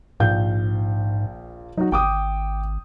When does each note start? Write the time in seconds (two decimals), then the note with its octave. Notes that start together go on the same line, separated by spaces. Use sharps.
0.20 A#1 G#2 F5 G6
1.77 F#3 D#4 F#4
1.92 G#1 G5 D6 D#6